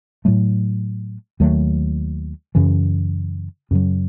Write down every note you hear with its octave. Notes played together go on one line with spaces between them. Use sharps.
A2 F#3 A3
D#2 D#3 F#3 A3
F#2 C#3 E3
F#2 C#3 F#3